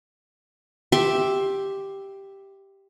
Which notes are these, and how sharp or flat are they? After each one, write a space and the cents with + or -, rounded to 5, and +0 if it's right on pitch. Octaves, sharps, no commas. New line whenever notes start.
G4 +0 E5 +0 C6 +15